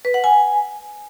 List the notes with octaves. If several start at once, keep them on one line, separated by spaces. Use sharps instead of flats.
B4
F#5
G#5